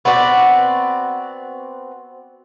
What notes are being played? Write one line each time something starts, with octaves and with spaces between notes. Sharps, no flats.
B3 C4 F#4 D5